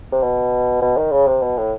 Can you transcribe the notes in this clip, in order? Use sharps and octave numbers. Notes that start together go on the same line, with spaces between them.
C3
B2
B2
D#3
C#3
C3
B2
A2